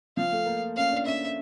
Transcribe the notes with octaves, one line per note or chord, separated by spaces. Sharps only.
F3 F5
A3
A#3
C#4 F5
D4
C#4 E5